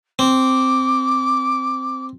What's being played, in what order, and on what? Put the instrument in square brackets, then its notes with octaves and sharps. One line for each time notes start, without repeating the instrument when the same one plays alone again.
[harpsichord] C4 [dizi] D6